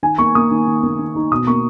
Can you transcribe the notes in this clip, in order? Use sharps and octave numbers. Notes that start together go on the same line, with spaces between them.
D#3 G#5
A#3 C#6
A#3 D#6
D#3
D#3
A#3
D#3
D#4
B2 D#6
A#3 C#6